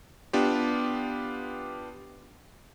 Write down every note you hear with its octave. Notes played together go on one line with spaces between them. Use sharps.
B3 D4 F4 G4